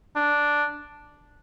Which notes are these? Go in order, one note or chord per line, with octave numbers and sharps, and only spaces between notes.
D4